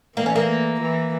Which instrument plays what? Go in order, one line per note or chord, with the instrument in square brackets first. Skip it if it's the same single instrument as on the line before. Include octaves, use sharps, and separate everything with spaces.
[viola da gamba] E3 [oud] A#3
[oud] C#4
A#3
[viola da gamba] E3